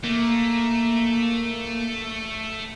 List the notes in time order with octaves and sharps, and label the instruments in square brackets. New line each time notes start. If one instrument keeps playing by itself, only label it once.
[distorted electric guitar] A3 [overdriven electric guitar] A#3